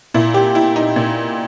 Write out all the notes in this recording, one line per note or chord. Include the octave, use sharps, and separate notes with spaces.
A#2 E4
G4
E4
D#4
A#2